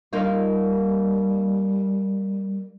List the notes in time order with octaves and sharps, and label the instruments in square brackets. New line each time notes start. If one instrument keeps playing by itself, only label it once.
[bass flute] G3 [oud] A#3 D#4 F4